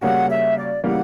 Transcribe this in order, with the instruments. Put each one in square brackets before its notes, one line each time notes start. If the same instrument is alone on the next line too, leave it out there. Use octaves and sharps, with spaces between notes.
[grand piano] C#3 G3 A#3 C#4 F#4 [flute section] F#5
[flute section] E5
D5
[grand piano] C#3 E3 G3 A#3 [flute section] F#5